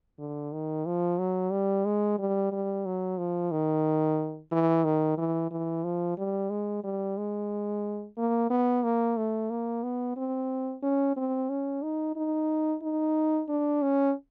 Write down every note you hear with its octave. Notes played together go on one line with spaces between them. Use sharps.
D3
D#3
F3
F#3
G3
G#3
G3
G3
F#3
F3
D#3
E3
D#3
E3
E3
F3
G3
G#3
G3
G#3
A#3
B3
A#3
A3
A#3
B3
C4
C#4
C4
C#4
D#4
D#4
D#4
D4
C#4